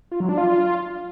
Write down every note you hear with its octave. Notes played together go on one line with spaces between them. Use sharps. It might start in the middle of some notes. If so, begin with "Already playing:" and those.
F4
F#3
D4
F4